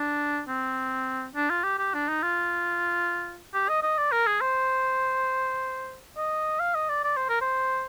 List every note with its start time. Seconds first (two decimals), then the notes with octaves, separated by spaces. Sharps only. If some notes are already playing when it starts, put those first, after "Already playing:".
Already playing: D4
0.48 C4
1.35 D4
1.50 F4
1.64 G4
1.79 G4
1.94 D4
2.08 D#4
2.23 F4
3.54 G4
3.68 D#5
3.83 D#5
3.98 D5
4.12 A#4
4.26 G#4
4.41 C5
6.17 D#5
6.60 F5
6.75 D#5
6.89 D5
7.04 D5
7.17 C5
7.29 A#4
7.41 C5